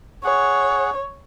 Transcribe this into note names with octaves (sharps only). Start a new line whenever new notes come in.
G#4 C#5 F#5